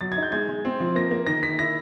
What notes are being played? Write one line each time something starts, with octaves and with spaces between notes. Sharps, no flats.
F#3 A6
G#6
D#4
G6
G#3 G#6
G#3
C4
F3
A#3 A#6
A#3
D#3 A#6
D#3 B6
E4 A#6